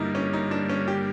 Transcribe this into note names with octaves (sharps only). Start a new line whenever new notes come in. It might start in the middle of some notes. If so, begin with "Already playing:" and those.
Already playing: G2 D3 G3 A#3 D#4 E4
C#4
D#4
D4
C#4
G4